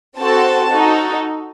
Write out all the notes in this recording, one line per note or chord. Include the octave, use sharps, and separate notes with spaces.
C4 F#4 A4 A5
D#4 F#4 A4